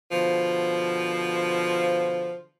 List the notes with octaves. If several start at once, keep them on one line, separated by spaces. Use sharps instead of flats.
B2 D3 F3